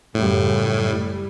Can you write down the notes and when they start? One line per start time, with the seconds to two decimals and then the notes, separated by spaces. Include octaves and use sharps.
0.14 F#2 A2 C#3 G3
0.76 G3